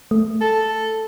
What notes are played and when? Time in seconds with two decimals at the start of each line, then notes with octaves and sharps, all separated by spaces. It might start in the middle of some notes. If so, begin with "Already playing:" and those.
0.11 A3
0.41 A4